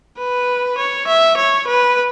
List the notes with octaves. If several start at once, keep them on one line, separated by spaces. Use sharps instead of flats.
B4
C#5
E5
C#5
B4